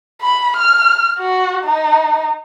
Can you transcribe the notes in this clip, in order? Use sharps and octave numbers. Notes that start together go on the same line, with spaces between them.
B5
F6
F#4
D#4